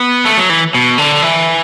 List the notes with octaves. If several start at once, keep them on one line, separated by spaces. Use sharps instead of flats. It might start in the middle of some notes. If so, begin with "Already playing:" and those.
Already playing: B3
A3
F#3
E3
B2
D3
E3